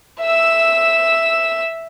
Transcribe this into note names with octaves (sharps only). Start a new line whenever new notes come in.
E5 E6